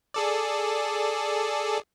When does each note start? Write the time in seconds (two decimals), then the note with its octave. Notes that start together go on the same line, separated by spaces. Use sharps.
0.14 G#4 A4 D5